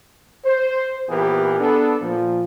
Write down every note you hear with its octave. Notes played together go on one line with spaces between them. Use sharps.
C5
A#2 E3 B3 G4 G#4 A#4
B3 D4 A4
A#2 F3